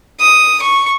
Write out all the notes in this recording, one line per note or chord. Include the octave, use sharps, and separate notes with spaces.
D#6
C#6